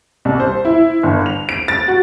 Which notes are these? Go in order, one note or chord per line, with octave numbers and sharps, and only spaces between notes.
C2
C5
E4
G1
F7
D7
A6
F#4